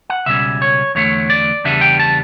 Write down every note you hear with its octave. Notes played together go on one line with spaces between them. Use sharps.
F#5
C#2 B2 G3 C#4 E5
C#5
E2 D3 A3 C#5
D5
E2 C#3 G3 B3 D4 E5
G5
A5